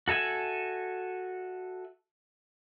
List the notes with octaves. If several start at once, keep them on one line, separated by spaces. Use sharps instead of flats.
F#4 A4 E5 G#5 E6